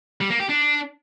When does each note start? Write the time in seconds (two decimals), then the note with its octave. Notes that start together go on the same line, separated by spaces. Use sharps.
0.21 G3
0.30 A#3
0.40 G4
0.49 D4